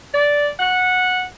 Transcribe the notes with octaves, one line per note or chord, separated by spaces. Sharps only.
D5
F#5